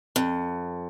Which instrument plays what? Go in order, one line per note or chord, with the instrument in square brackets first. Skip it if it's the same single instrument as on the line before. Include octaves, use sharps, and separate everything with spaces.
[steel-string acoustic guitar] F2